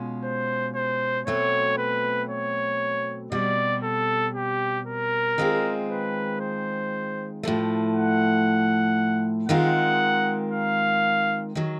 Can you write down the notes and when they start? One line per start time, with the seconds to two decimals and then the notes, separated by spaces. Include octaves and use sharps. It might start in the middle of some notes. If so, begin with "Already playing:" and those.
Already playing: B2 G#3 C#4 F4
0.24 C5
0.75 C5
1.27 B2 F#3 A3 C4 C#5
1.78 B4
2.29 C#5
3.32 B2 G3 C4 D5
3.83 A4
4.35 G4
4.86 A#4
5.38 D#3 G#3 C4 F4 G#4
5.89 B4
6.40 C5
7.43 A2 F3 A3
7.94 F#5
9.49 D#3 G#3 C4 F4 A#4 F#5
10.51 F5
11.55 D#3 F#3